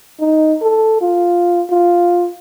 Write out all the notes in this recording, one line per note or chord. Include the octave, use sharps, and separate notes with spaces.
D#4
A4
F4
F4